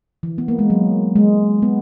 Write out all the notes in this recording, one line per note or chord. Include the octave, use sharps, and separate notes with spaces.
E3
B3
A#3
G#3
F#3
G#3
B3